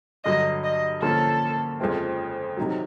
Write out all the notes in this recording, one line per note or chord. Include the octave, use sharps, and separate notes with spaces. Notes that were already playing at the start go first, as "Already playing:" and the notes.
G2 D3 F#3 D#5
D#5
D3 F3 A#3 C#4 A4
F2 C#3 F3 G#3 C4
C3 D#3 F#3